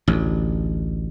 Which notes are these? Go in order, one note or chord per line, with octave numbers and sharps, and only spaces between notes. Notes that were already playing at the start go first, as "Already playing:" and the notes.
A1 D2